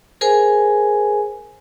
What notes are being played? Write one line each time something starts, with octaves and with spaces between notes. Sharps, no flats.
G#4 A#4 C5 G#5